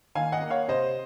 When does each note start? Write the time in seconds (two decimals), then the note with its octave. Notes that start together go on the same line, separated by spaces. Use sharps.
0.15 D#3 F5 G#5
0.32 D#5 F#5
0.41 A#3
0.50 C#5 F5
0.68 C3 C5 D#5